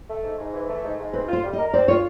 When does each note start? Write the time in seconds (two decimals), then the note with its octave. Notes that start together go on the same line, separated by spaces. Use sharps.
0.09 A3
0.23 G#2
0.38 G#2
0.53 E3
0.68 A3
0.83 G#2
0.99 G#2
1.13 C4 B4
1.28 F4 C5
1.44 G3
1.53 D#5
1.59 A#4
1.73 C4 D5
1.88 F4 C#5